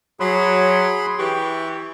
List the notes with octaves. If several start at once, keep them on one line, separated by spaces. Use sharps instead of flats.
F#3 G#4 B5 C6
E3 G4 C#6